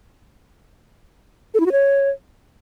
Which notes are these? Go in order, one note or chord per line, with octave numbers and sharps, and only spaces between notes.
A4
E4
F#4
C#5